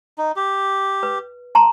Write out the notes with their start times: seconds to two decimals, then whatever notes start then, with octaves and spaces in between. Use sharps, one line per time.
0.18 D#4
0.36 G4
1.03 B4
1.55 A5 A#5 C6